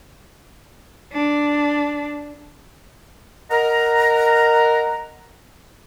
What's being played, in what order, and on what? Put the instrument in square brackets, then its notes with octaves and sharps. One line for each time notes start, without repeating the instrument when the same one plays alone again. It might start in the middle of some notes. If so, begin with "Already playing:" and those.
[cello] D4
[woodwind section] A#4 D#5 F#5 A#5